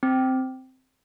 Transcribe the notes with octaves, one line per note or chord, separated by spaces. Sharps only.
C4